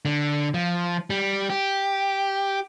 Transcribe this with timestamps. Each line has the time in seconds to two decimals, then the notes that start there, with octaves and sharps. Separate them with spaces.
0.05 D3
0.54 F3
1.10 G3
1.50 G4